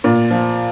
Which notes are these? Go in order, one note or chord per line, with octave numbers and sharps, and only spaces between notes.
A#2
F3